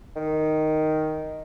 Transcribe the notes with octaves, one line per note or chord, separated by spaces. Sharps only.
D#3